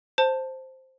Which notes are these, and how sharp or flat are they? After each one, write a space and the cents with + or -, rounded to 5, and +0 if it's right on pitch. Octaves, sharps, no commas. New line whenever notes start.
C5 +0 A5 +10